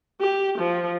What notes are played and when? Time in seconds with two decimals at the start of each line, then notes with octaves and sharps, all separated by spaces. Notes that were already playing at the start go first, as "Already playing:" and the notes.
0.20 G4
0.58 F3